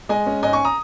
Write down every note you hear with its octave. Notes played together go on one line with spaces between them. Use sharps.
G#3 D#5 G#5
C#4
G#2 D#5 G#5
G#5 C#6
A#5 D#6